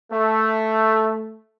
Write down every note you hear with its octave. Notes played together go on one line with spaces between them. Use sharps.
A3